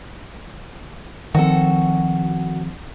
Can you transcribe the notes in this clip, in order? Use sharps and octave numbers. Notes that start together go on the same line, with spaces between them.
D#3 F3 C4 F#4 A4